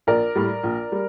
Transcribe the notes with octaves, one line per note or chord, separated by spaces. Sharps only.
A#1 A#4 D5
A2 G3
A#1
G3